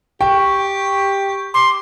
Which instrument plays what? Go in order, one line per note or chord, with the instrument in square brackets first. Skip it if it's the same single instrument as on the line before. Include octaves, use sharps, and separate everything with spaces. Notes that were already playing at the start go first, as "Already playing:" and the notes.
[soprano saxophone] G4 [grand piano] G5 [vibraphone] C#6
[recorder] C6 [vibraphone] D6